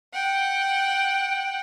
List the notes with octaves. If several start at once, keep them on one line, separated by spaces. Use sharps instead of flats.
F#5 G5